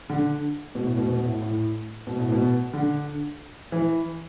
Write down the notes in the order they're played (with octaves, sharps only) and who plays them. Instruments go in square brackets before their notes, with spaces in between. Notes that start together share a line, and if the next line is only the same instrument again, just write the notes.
[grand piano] D3
B2
A2
B2
B2
A2
A2
B2
A2
B2
D3
E3